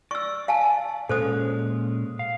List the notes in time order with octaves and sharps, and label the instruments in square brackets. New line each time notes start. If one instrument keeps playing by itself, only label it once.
[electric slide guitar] D5 [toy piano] C#6 E6
[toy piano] F5 G#5 A5
[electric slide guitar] A#2 G#3 C#4 [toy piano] A4 C5 D#6
[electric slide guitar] F5